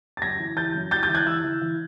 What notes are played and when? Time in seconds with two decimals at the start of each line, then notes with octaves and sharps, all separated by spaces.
0.17 A6
0.22 F#2 G#6 A#6
0.39 E3
0.56 E3 G6 A6
0.74 F#2
0.91 E3 G6 A6
1.03 G6 A6
1.09 E3
1.15 F#6 G#6
1.26 E3 E6 F#6
1.44 E3
1.61 E3